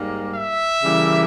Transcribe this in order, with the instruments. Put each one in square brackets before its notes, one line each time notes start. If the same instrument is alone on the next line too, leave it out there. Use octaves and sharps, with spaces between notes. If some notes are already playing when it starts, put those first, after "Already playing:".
Already playing: [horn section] G#2 G3 A#3
E5
C#3 E3 G3 A#3